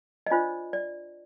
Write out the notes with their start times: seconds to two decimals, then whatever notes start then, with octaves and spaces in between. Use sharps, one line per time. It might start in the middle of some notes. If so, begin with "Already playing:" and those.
0.27 D#5
0.30 D4 F4 C5 D5
0.73 D5